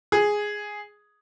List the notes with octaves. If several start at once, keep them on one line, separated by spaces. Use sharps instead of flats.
G#4